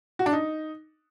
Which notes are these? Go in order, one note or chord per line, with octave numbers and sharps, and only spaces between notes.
F#4
D4
D#4